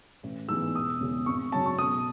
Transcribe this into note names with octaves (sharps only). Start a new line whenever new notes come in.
A1
G#2 E3 G#3 B3 E6
E1 D#6
E2 C#3 G#3
G#1 C#6
F#2 C#3 F#3 A5
C#6
B1 D#6